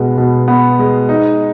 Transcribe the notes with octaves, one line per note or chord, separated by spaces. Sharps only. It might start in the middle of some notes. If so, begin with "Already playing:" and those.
Already playing: B2 G#3 B3
B2
B3
G#3
D#4